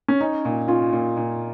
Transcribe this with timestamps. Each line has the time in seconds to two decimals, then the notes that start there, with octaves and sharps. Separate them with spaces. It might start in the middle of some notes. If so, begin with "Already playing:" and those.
0.08 C#4
0.21 C#4 D#4
0.45 A#2
0.68 C#4 F4
0.93 A#2
1.17 A#2